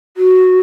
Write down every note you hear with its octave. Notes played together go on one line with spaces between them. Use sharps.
F#4